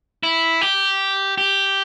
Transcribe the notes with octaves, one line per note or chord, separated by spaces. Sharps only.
E4
G4
G4